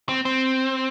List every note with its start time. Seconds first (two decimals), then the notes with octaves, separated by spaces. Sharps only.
0.09 C4
0.25 C4